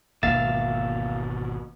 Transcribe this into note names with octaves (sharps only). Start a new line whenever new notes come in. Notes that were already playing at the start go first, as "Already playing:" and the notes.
G#1 D2 B2 A#3 E5 F5 A6